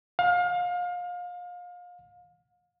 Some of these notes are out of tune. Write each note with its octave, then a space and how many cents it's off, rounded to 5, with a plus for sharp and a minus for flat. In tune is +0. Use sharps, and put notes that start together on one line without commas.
F5 +30